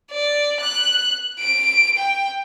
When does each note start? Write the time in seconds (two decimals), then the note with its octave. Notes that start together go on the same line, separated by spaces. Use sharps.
0.12 D5
0.61 F#6
1.40 D7
1.97 G5